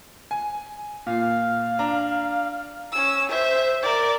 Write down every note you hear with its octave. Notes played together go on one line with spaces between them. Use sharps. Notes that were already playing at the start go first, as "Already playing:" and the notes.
G#5
A#2 F5
D4 A#5
C#4 E6
C5 E5
A#4 D5